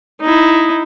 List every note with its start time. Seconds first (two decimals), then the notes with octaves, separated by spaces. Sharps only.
0.21 D#4 E4